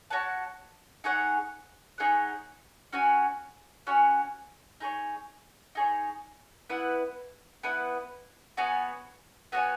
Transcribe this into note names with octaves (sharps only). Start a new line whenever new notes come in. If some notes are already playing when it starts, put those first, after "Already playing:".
F#4 C#5 F#5 A5
D#4 G#4 C#5 F#5
D#4 G#4 C#5 F#5
C#4 F#4 C#5 G#5
C#4 F#4 C#5 G#5
D#4 G#4 C#5
D#4 G#4 C#5
B3 E4 B4 F#5
B3 E4 B4 F#5
B3 F#4 C#5 G#5
B3 F#4 C#5 G#5